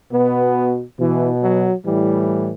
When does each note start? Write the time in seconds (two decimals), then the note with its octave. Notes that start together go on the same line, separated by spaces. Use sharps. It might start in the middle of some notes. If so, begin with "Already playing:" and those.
0.12 B2 B3
0.99 B2 E3
1.43 F#3
1.86 A2 E3 G3